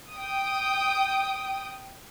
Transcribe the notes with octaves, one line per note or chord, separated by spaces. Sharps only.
G5 D#6